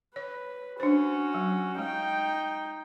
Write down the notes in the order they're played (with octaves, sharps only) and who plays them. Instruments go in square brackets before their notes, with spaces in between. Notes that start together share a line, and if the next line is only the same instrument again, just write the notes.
[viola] B4 [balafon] C#5
[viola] C#4 F#4 [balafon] D4 C5
[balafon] F#3
[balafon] G#3 [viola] D#4 G5